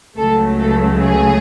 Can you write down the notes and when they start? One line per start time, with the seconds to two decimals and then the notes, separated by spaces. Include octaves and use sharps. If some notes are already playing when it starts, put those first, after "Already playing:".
0.17 C#2 C#3 F#3 A3 A4
0.60 A4
1.02 G#4